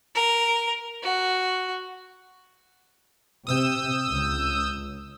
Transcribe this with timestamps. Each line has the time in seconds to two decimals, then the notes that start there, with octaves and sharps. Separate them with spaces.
0.15 A#4
1.02 F#4
3.47 C3 D#6 E6 G6
4.08 C#2